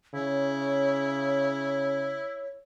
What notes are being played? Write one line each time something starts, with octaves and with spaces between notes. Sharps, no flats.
C#3 E4 C#5